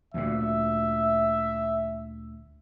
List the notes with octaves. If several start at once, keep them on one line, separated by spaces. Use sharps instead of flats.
D2 A#2 E5